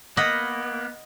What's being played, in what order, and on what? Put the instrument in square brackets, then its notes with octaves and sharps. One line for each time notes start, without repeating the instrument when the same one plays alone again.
[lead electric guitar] A#3 B3 [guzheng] D#5 F#5 B5